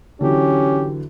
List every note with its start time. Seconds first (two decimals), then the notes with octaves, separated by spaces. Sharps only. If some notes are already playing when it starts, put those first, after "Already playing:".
0.21 D3 E3 F#3 C#4 G4